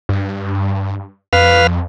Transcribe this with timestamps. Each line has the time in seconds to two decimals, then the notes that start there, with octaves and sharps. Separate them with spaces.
0.09 G2
1.33 F2 B4 F5